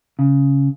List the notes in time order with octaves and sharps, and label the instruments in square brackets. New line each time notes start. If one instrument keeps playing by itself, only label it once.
[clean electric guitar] C#3